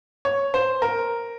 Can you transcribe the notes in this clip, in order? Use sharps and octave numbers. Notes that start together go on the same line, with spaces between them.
C#5
C5
A#4